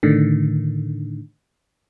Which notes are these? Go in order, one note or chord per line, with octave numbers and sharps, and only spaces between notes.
A2 D3 D#3